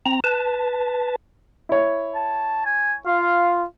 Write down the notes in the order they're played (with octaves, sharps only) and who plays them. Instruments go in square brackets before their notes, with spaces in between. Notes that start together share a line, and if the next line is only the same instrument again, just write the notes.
[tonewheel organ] C4 A#5
B4 A5
[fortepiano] E4 C#5
[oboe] A5
G#5
[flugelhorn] F4 [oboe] F5